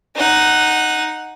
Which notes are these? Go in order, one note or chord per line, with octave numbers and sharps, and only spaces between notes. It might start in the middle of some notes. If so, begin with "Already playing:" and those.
D#4 F#5